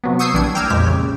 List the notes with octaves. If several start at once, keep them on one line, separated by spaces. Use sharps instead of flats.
C3 F#3 B3
C#6 D#6 E6 G6 G#6 C7
A#1 E3 G3 D4 G#6
G5 A#5 D6 E6 F6 G#6
F2 A#2 G#3 G4 B6
C#3